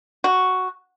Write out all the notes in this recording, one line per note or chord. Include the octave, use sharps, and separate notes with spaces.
F#4